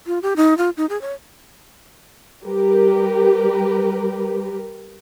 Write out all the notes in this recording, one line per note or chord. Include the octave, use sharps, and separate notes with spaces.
F4
G4
D#4
F4
D#4
G#4
C#5
G3 G4 A#4 B4